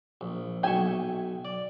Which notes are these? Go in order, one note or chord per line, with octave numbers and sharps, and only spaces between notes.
A#1
B1 E5 G5 G#5 C#6
D5